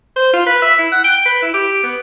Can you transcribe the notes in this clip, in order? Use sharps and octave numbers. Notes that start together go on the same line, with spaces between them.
C5
F4
B4
E5
E4
F#5
G5
B4
E4
G4
B3